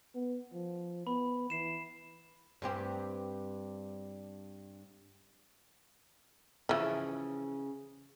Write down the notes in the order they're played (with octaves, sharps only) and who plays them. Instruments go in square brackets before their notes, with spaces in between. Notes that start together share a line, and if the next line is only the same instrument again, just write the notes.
[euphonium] B3
F3
[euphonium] B3 [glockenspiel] B5
[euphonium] E3 [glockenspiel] C7 E7
[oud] G2 C4 G4
[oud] C#3 [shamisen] E3 F3